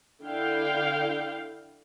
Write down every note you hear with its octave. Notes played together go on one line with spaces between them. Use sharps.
D3 E4 F5 G5